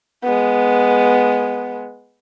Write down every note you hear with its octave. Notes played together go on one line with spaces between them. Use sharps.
G#3 B3